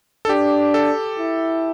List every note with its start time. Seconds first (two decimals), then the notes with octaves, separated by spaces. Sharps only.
0.25 A4
0.29 D4 G4
0.74 A4
1.19 E4